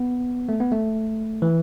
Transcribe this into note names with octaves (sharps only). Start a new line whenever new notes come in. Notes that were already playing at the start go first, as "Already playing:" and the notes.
Already playing: B3
A3
B3
A3
E3